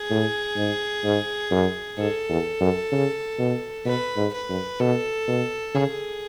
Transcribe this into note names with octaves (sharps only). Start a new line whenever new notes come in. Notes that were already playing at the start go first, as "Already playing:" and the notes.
Already playing: G#4
A2
G#2
G#2
F#2
G#2 A4
E2
F#2
C#3
B2
B2 B4
G#2
B4
F#2
B2 A4
B2
C#3 G#4